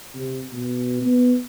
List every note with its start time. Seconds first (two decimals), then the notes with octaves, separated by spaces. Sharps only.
0.15 C3
0.53 B2
1.02 B3